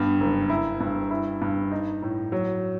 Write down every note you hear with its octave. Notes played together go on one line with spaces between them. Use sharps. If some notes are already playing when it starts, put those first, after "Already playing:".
Already playing: G2 B3
F#1
E4
G2
E4
G2
D#4
A2
F#3